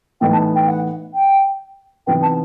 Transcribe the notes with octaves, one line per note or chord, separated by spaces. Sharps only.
A2 E3 B3 D#4 G5
A5
G5
F#5
G5
C3 E3 B3 D#4 G5
A5